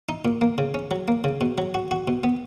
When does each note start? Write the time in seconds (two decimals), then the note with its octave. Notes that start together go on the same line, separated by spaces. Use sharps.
0.09 D#4
0.25 A#2
0.41 A#3
0.58 C#3
0.74 C#4
0.91 F#3
1.08 A#3
1.24 C#3
1.41 B2
1.58 F#3
1.74 F#4
1.91 F#4
2.08 B2
2.24 B3